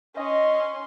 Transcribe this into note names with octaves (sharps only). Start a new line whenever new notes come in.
C#4 D#5 C6